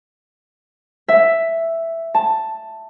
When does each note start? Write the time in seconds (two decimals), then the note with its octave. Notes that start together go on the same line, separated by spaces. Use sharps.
1.08 E5
2.14 A5